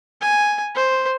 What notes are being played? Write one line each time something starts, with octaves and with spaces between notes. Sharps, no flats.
G#5
C5